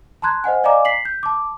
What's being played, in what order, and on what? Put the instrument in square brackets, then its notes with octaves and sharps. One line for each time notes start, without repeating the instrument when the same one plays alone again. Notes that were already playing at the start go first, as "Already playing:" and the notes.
[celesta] A5 A#5 C6 F#6 G#6
C5 D#5 F#5 G#5
D5 D#5 F5 G#5 A#5 D6
B6 C7 F#7
G6
A5 D6